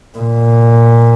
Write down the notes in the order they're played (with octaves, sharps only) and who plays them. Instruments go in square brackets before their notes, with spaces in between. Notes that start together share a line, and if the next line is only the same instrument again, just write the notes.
[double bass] A#2